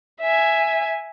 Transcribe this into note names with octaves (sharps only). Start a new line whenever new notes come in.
E5 G#5